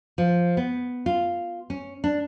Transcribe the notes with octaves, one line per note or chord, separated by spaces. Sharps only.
F3
B3
F4
C#4
D4